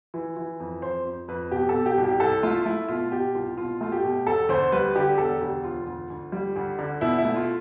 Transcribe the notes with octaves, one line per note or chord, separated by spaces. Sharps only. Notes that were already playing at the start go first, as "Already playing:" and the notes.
E3
E3
F2
F2 C5
F2
F2 B4
B2 G4
A4
B2
G4
C2
G4
C2 A4
A3 F4
A3 E4
B2 F4
B2 G4
C2 F4
B2 F4
A3 F4
G4
B2
E1 A4
D2 C5
G3 B4
D3 G4
E1 A4
D2 G4
E1 F4
D2
D2
G3
D2
D3
B2 E4
E4
A3
F4